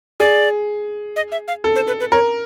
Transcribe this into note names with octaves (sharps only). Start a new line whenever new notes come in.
G#4 D5
D#5
E5
F5
A4
C5
B4
B4
A#4 C#5